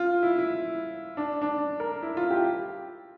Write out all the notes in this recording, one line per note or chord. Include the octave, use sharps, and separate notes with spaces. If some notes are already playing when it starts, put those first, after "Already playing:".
Already playing: F4
E4
E4
D4
D4
A#4
E4
F4
G4